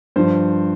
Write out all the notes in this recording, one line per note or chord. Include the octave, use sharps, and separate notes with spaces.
G2 F3 C5